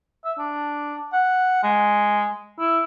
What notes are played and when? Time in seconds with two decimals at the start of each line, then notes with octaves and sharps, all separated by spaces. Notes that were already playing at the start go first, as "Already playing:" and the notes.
0.25 E5
0.39 D4
1.13 F#5
1.63 G#3
2.59 E4